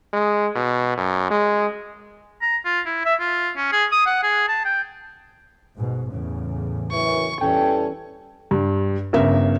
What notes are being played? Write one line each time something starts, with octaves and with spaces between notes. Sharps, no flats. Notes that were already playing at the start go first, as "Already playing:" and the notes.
G#3
B2
F#2
G#3
A#5
F4
E4
E5
F4
C#4
G#4
D#6
F#5
G#4
A5
G5
G1 G#2 B2
E2 A2 C#3
F#2 E3 C#6
E2 E3 G3 C#4 A4 G5
G2
G1 C#3 A#4 E5